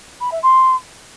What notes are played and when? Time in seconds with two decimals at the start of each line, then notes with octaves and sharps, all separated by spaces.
0.21 B5
0.32 E5
0.43 C6